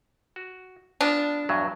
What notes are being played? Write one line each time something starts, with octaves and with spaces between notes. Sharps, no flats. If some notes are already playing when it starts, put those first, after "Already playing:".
F#4
B3 D4 F4 A#5
E2 G2 F#3